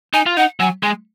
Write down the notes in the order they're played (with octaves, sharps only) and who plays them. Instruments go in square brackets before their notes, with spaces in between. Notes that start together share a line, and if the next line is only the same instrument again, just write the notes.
[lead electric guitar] D#4 [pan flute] G#5
[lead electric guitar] F4
[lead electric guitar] D#4 [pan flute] F#5
[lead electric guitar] F#3 [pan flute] G#5
[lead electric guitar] G#3 [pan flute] G#5